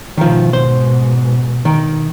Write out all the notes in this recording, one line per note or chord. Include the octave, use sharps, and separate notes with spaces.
G#2 B2 D#3 F3
C5
D#3